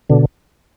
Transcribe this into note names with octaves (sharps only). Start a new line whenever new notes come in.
B2 D3